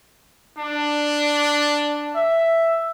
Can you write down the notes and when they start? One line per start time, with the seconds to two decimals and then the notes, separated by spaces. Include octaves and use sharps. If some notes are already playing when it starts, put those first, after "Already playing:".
0.57 D4
2.16 E5